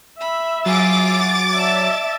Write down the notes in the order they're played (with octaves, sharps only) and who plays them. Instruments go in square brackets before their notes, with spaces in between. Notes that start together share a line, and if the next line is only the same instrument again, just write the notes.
[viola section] E5 [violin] B5
[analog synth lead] F#3 [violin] F4 G#4 [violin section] D6 A6
[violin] D5 A5 [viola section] E5